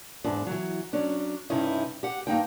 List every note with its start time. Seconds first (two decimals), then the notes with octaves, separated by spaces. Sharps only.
0.24 E2 G#2 D4
0.47 E3 F#3
0.93 F#3 C#4 D4
1.50 G2 C3 C#4 D#4 E4
2.03 G4 F#5
2.27 G2 A#3 D#4 G5